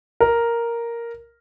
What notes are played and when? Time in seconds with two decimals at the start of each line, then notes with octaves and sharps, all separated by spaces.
0.20 A#4